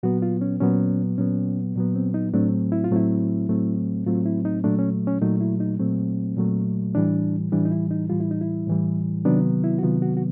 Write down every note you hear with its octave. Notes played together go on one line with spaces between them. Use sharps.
A#2 F#3 B3 F#4
F4
C#4
A#2 F#3 B3 C#4
A#2 F#3 B3 C#4
A#2 F#3 B3
C4
D#4
A2 F#3 A3 C4 D4
E4
F4
A2 F#3 A3 C4 E4
A2 F#3 A3 C4
A2 F#3 A3 C4 F4
E4
D#4
A#2 F#3 A3 D4
C#4
C#4
A#2 F#3 A3 D#4
E4
D#4
A#2 F#3 A3 C4
A#2 F#3 A3
A2 E3 G3 D4
A2 E3 G3 D4
D#4
E4
D#4
A2 E3 G3 F4
E4
D#4
E4
A2 E3 G3
C3 D#3 F#3 B3 D4
E4
F#4
C3 D#3 F#3 B3 F4
F#4
F#4